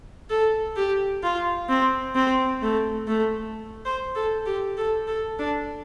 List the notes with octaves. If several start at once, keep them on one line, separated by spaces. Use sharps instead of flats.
A4
G4
F4
C4
C4
A3
A3
C5
A4
G4
A4
A4
D4